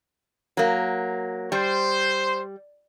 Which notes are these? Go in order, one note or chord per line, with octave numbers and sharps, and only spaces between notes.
F#3 A#3
G3 C5